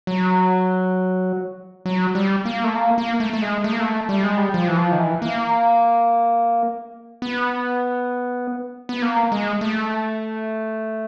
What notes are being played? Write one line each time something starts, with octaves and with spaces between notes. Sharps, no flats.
F#3
F#3
G3
A#3
A3
A#3
A#3
A3
A3
G#3
A3
A#3
A3
G3
G#3
G3
F3
E3
F3
D#3
E3
A#3
B3
B3
A#3
G#3
A3